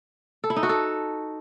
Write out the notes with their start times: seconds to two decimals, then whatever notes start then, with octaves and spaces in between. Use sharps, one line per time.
0.44 A4
0.50 E4
0.56 D#4
0.63 F#4
0.69 A4